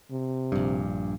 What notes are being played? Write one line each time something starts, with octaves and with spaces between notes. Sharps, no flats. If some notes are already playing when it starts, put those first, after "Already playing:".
C3
A#1 G2